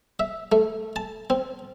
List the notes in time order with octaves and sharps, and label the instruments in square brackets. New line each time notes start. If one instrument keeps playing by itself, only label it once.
[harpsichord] E5
A3
A5
C4